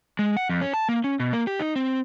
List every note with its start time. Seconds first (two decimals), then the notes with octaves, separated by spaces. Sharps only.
0.19 G#3
0.37 F#5
0.49 F2
0.61 C#4
0.74 A5
0.89 A#3
1.04 C#4
1.20 B2
1.33 A#3
1.47 G4
1.60 D#4
1.76 C4